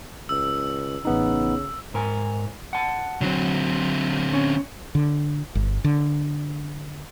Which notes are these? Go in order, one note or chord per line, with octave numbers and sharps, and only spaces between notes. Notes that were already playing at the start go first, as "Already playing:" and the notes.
C#2 E6
A1 C#3 B3 D#4
G#2 A#4 G#5
F#5 A5
D3 F#3 C4
C#4
D3
G1
D3